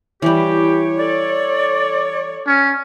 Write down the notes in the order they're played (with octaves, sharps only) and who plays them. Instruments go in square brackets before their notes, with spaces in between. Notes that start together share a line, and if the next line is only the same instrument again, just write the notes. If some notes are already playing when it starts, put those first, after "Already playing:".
[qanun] E3 G3 [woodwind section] G4 [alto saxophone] C#5
[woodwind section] A4 D5
[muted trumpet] C#4